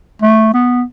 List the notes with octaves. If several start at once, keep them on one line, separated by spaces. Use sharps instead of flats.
A3
B3